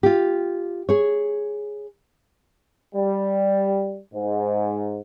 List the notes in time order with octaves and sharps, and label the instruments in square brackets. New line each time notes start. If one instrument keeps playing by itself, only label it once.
[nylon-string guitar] F4 G4
G#4 C#5
[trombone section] G3
G#2